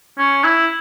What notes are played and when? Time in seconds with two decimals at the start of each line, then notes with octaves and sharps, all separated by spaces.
0.19 C#4
0.44 E4